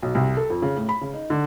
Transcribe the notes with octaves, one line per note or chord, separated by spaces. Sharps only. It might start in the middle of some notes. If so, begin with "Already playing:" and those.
B1
C2
A4
F2
C#3
A2
B5
C#3
D#4
D3